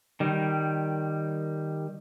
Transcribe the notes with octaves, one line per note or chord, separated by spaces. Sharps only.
D#3 G3